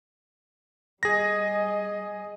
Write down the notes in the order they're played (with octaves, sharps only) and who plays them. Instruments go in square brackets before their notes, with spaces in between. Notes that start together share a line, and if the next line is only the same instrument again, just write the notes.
[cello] G3 D#5 [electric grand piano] G#4 A#6